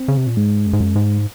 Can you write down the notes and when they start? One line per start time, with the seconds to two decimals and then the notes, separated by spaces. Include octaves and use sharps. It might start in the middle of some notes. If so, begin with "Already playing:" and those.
Already playing: C4
0.08 C#3
0.17 C3
0.27 A#2
0.37 G#2 G#3
0.66 F#2
0.73 G#2
0.80 F#2
0.96 G#2